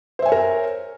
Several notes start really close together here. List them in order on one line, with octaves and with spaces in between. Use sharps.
C5 E5 G#5 C#5 A#4